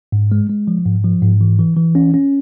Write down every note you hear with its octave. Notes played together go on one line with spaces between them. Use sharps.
G#2
G#3
G#3
F3
G#2
F3
G#2
E3
E3
E3
C#4
C#4